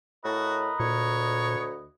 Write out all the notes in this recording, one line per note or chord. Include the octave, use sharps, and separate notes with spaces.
A2 F#4 A#4 B4 D#5
D2 A#2 C#5